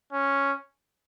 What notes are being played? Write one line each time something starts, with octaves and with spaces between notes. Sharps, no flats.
C#4